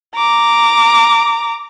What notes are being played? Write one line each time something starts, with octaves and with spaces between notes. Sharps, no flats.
A#5 D6